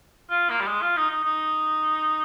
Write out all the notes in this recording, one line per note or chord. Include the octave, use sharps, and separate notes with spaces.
F4
A#3
G3
G#3
F4
D#4
D#4
D#4